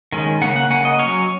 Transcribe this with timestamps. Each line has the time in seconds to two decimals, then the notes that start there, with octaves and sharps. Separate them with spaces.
0.12 D#3 G#3 C#4
0.42 C#3 A#3 C#4 F#5
0.56 F#5
0.70 C#3 A#3 C#4 F#5
0.85 D#5
0.99 F#3 C#4 C#5